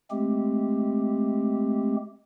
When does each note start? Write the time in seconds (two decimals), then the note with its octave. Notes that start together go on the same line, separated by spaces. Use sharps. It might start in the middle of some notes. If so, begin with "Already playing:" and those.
0.11 G#3 A3 C4 G4